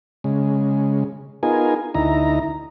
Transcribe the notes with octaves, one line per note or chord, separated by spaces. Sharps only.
C#3 G#3
B3 D#4 F4 G#4 A#4 G#5
D2 D#4 E4 A#5